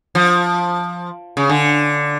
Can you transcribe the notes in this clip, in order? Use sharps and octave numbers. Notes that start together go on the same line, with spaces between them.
F3
C#3
D3